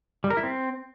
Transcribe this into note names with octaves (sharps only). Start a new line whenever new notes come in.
G3
A#4
E4
C4